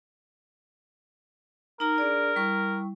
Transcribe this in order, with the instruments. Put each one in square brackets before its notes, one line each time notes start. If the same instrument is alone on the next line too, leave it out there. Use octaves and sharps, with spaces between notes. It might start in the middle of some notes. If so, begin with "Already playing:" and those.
[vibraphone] D#4 A#5 [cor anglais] A#4
[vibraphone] D4 G#4 D5
G3 E4 C#6